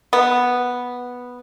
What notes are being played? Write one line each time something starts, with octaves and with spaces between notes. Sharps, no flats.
B3